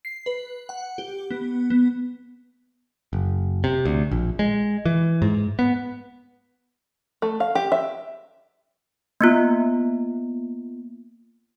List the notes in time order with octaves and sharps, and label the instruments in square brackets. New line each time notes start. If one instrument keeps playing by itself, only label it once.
[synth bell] C7
B4
F#5
G4
B3
B3
[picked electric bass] F#1
C3
D2
A#1
G#3
E3
G#2
B3
[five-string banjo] A3
F5
G4
E5
[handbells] A#3 B3 F4